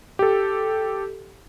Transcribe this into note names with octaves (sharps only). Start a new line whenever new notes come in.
G4 A4